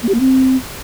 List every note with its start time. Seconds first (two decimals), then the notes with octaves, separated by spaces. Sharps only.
0.03 A#3
0.09 G4
0.14 A#3
0.20 C4